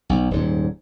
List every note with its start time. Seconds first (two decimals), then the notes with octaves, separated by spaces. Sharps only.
0.09 B1
0.31 D#1 G#2